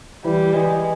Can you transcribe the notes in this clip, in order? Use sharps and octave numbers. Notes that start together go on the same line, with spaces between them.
E3 G3
E3 G#3